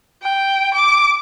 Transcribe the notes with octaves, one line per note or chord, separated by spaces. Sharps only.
G5
D6